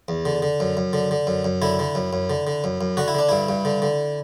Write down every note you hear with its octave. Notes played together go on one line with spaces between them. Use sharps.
E2
D3
D3
F#2
F#2
D3
D3
F#2
F#2
D3 E4
D3
F#2
F#2
D3
D3
F#2
F#2
D3 F#4
E4
D3 D4
G2 E4
G2
D3
D3